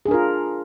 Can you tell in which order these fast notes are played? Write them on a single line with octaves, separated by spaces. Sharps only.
G#4 D4 A#4 F4